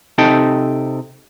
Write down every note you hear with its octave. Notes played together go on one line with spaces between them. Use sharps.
C3 D#4 A4 G5